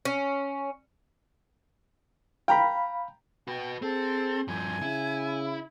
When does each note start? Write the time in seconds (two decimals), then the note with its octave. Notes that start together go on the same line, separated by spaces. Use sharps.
0.05 C#4
2.48 F5 G5 A#5 B5
3.48 F#4 B4 G5
3.82 C4 G#4 A4
4.48 G2 F3 G#5
4.82 C#3 E4